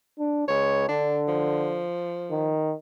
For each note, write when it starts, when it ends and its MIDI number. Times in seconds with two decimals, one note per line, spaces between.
0.19 0.46 62
0.48 0.86 37
0.48 0.87 73
0.89 1.85 50
0.89 1.23 62
1.28 2.55 53
2.31 2.74 51